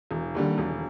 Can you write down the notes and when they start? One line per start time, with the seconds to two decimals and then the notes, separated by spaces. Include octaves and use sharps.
0.11 E1
0.35 D#2 D3 G3
0.58 E1